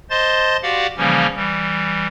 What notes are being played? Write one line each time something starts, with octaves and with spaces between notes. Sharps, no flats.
C5 D#5 A5 C6 A6
F#4 G4 D5 F5 F#5
C#3 E3 F3 G3 A#3 C#4
E3 G3